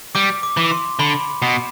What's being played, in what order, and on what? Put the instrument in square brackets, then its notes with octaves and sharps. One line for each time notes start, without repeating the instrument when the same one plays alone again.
[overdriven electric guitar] G3 [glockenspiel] D6
[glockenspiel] D6
[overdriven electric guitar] E3
[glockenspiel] C6
[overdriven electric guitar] D3 [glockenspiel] B5
[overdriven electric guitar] B2